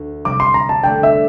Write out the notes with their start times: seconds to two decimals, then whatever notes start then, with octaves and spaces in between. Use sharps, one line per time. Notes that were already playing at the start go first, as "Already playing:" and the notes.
Already playing: D2
0.25 C3 G3 C4 D6
0.40 C6
0.54 A#5
0.69 A5
0.83 D3 A3 D4 G5
1.03 E5